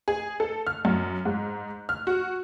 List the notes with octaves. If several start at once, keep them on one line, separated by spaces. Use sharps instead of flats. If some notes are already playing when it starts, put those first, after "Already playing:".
G#4
A4
F6
F#2
G#2
F6
F#4